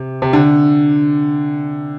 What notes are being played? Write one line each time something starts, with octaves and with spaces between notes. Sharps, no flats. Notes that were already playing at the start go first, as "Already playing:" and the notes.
Already playing: C3
C3
D3